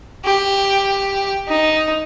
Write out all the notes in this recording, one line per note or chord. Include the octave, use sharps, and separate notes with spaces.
G4
D#4